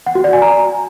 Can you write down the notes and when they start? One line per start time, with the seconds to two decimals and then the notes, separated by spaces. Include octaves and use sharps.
0.06 F#5
0.15 F#4
0.24 D5
0.33 G#5
0.42 A#5